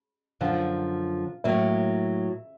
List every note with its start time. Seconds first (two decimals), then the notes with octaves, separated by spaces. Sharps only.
0.41 F#2 D3 F3 F5
1.44 A2 F#3 A#3 E5